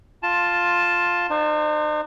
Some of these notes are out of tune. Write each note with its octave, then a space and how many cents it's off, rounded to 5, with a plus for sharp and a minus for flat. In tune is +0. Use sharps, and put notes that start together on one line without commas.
F4 +5 A5 +0 C6 +10
D#4 -45 C5 +0